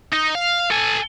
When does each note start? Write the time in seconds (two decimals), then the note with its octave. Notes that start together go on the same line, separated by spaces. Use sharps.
0.13 D#4
0.35 F5
0.71 A4 G#5